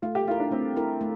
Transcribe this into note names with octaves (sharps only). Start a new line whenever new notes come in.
A3 F4
G4
E4 F4 A#4
D4
A3 C4
E4 A#4
A3